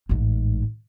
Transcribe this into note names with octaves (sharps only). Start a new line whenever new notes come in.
A1 G#2